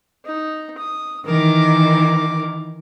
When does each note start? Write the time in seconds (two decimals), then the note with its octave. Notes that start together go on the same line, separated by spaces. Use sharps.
0.25 D#4
0.78 D#6
1.26 D#3 E3 A#4 D6